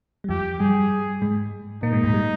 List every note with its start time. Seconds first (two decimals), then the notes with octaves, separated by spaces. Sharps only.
0.24 G3
0.29 F2 F3 G4
0.60 G2 G3 G#4
1.22 G#2 G#3
1.83 A#2 A#3 D#4
1.93 G#2 G#3
2.04 G#2 G#3
2.14 G3